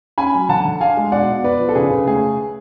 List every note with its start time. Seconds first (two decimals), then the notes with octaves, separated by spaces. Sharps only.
0.18 C#4 G#5 B5
0.34 F#3
0.49 D3 F#5 A5
0.65 D3
0.80 D4 F5 G#5
0.97 G#3
1.12 B2 D5 F#5
1.29 B2
1.44 B3 B4 D5
1.59 F3
1.69 A4
1.75 C#3 G#4 B4
1.91 C#3
2.07 A3 G#4